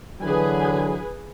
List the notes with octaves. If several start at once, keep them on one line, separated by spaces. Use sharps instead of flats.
D3 E3 F#3 G#4 B4 G#5